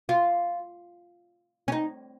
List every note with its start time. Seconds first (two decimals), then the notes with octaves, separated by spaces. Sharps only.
0.09 F4
1.68 C#4
1.72 D#4